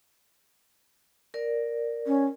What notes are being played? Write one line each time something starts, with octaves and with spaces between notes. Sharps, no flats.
A#4 D5
C#4